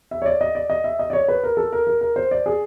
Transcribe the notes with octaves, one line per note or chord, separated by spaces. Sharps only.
E5
C#5
D5
D#5
D5
D#5
E5
D#5
D5
C#5
B4
A#4
A4
A#4
A#4
A#4
C5
D5
G#4